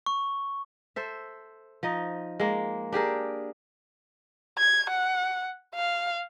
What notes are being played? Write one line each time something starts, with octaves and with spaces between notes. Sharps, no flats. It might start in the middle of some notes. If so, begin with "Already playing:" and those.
C#6
A4 C5 E5
F3 D#4 D#5
G#3 A#3
D4 G4 G#4 A#4
G#6
F#5
F5